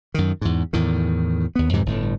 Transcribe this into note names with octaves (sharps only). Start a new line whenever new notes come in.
F#2 D#3
E2 G#2
E2 A2 D#3
D#2 B3
F2 G#2 C3 E3
G1 A2